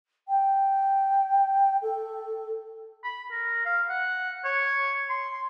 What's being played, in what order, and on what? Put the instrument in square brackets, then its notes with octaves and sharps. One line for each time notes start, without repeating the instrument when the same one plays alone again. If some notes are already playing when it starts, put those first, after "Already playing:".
[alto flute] G5
A4
[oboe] B5
A#4
F5
F#5
C#5
C6